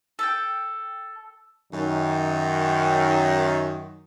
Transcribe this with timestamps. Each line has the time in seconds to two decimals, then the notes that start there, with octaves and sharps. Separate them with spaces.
0.19 A4 G5
1.72 F#2 D#3